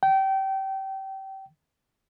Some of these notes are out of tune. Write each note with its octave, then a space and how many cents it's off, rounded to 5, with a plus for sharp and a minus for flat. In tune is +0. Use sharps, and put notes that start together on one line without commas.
G5 -25